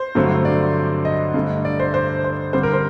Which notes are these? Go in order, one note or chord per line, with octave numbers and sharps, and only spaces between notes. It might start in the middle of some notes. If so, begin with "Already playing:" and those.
Already playing: C5
G2 D3 F#3 A3 C4
D5
D#5
G2 D3 A3
D5
C5
C5
C5
D3 G3 C4 C5
A#4
C5